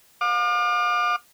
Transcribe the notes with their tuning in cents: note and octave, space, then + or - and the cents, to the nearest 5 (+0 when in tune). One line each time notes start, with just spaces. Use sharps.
F5 +40 D6 +40